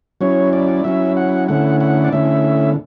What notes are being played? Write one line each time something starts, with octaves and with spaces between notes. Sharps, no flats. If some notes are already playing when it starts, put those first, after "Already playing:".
F#3 C#4 E4 C#5
D5
F#3 C#4 E4 E5
F#5
D3 A3 C#4 E4 F#5
F#5
D5
D3 A3 C#4 E4 E5